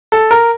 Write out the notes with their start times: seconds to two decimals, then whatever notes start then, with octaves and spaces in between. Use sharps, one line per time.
0.12 A4
0.31 A#4